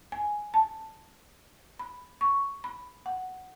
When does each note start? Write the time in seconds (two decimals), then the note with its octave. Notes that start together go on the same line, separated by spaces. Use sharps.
0.12 G#5
0.54 A5
1.79 B5
2.21 C#6
2.64 B5
3.06 F#5